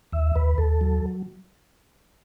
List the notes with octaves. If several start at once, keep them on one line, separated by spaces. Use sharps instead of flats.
D#2 E5
D#2 B4
D#2 A4
F#3